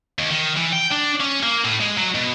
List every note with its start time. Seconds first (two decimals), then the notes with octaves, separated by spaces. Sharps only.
0.19 D#2
0.31 D#3
0.57 E3
0.73 G5
0.91 D4
1.20 C#4
1.43 A#3
1.65 A2
1.81 G#3
1.97 F#3
2.15 B2